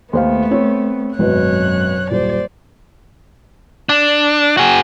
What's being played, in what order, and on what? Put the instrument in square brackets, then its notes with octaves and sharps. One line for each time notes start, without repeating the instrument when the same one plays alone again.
[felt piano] D#2 C5 F5 [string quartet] A3 B3
[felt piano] C4 C#5
[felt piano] G#1 B2 B4 [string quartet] F#2 C#5 F#6
[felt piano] D#1 [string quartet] C5 D5
[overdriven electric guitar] D4
F#4 G#4